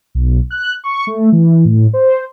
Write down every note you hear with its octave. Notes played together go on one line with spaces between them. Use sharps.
B1
F#6
C#6
A3
E3
A2
C5